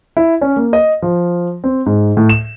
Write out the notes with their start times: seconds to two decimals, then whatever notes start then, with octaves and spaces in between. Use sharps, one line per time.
0.17 E4
0.41 C#4
0.56 A#3
0.73 D#5
1.02 F3
1.64 C4
1.86 G#2
2.17 A2
2.29 E7